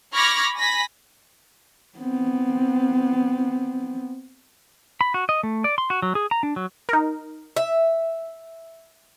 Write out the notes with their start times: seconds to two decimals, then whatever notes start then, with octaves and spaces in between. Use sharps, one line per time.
0.14 B5 C#6 D6 F6 G#6 A#6
0.57 G#5 B5 A#6 B6
1.99 B3 C4
5.01 B5
5.14 F#4
5.29 D#5
5.43 A3
5.64 D5
5.78 C6
5.90 F#4
6.02 F#3
6.15 G#4
6.31 A#5
6.43 D4
6.56 F#3
6.89 D#4 A#4
7.57 E5